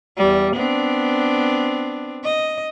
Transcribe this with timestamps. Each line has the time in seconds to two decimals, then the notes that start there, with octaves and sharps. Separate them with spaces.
0.17 E2 G3
0.56 B3 C4 D4
2.24 D#5